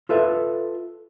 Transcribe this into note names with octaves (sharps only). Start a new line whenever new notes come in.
F4 A4 B4 E5